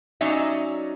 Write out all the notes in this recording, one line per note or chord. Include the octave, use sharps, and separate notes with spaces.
F#3 C#4 D#4 D5 E5